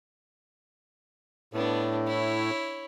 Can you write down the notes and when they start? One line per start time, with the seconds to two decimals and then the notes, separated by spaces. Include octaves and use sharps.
1.53 A2 B3 D4
2.07 E4 C#5